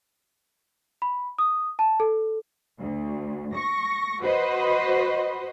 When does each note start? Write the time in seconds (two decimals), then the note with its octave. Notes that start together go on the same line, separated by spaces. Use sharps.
1.02 B5
1.38 D#6
1.79 A5
2.00 A4
2.80 D2
3.54 C#6 A#6
4.21 F#4 B4 C5 D#5